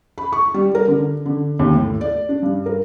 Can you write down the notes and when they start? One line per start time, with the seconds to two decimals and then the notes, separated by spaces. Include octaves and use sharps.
0.18 B5
0.33 C#6
0.54 G3
0.75 A#4
0.88 D3
1.26 D3
1.59 D#2
1.76 A2
2.01 D5
2.29 D4
2.42 G2
2.66 A#4